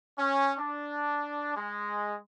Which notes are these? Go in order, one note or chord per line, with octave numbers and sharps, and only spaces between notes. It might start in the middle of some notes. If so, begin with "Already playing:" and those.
C#4
D4
G#3